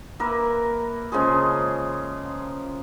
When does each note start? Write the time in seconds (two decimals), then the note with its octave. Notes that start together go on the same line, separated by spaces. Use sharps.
0.20 A#3 A#4 B4 E5
1.12 C#3 F3 G#3 G#4